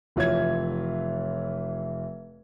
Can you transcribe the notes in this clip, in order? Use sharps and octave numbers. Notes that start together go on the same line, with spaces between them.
F1 E3 F4 C#5 E5 G#6